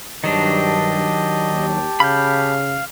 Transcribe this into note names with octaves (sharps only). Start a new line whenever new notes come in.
G2 D#3 F#3 D4 G4 D#5 A5
D#2
C#3 F5 B5 G6